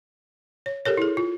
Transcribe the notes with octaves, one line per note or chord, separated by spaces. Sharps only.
C#5
G4 A4 A#4 C#5
E4 G#4
F4